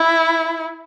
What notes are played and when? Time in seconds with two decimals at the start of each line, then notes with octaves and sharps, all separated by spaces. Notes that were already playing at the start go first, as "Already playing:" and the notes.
Already playing: E4